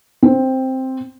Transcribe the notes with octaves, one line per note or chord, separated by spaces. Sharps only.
C4